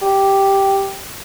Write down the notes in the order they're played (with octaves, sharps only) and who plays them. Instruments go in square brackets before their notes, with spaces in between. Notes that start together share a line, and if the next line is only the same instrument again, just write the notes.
[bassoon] G4